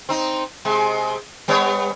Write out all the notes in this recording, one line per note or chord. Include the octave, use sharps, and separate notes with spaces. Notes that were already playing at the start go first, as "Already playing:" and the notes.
C4 D#4
C3 G#3
G3 B3 C#5